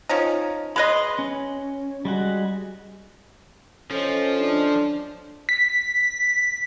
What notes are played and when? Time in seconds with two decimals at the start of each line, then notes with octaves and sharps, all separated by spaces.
0.09 F3 C#4 D#4
0.76 G#3 B4 D#5 B5 C6
1.19 C#4
2.05 G3 G#3 F#4
3.91 F3 C#4 A4 C5 D#5
4.39 D4
5.49 B6